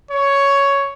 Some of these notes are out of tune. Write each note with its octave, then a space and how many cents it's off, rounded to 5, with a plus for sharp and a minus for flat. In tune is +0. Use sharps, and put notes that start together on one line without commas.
C#5 +5